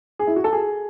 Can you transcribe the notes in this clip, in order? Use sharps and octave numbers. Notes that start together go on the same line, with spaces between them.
G#4
E4
F#4
A4
G#4